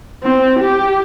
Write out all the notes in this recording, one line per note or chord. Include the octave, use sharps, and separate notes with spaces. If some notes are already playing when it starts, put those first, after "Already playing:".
C4
G4